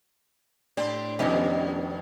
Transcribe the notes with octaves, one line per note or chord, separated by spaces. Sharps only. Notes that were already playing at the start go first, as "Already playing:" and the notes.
A2 C4 D4 G4 C5
F1 B2 D#3 B3 C#4 D#4 G4